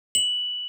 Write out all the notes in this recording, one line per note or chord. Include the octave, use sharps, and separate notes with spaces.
F#7